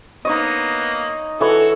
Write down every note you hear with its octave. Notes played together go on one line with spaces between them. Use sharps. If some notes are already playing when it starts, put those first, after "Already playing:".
A#3 B3 D#4 C#5 D#5
E3 F#4 A4 C#5